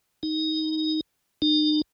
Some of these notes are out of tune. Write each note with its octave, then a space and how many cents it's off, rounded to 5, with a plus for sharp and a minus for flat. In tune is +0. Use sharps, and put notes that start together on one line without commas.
D#4 +10
D#4 -40